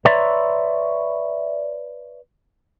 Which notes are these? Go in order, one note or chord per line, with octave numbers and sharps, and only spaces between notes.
B4 C#5 D5 E5 A#5 C6